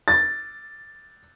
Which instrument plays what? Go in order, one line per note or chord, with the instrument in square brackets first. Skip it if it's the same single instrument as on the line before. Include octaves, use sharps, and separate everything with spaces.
[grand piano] A6